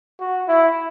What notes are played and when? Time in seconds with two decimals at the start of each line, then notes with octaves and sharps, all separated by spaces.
0.20 F#4
0.48 E4